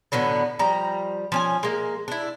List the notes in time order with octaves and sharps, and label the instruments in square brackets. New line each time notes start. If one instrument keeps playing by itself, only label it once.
[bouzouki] A2 D3 F#3 B3
F3 G3 A#5
F3 C#4 G#5
G#3 A#3
D4 E4